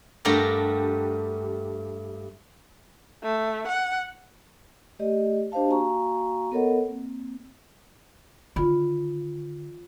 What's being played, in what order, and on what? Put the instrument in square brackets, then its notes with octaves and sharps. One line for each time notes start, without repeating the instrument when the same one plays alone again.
[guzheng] G2 A3 F#4 G4 A#4
[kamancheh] A3
F#5
[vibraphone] A3 G4 D5 D#5
D4 G4 C5 D#5 F5 A5
A#3 F#4 F5 G#5 A#5 C#6
B3 A4 A#4 C#5 D#5 F#5
A#3 C4
[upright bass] D3 D#3 [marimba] F4 B5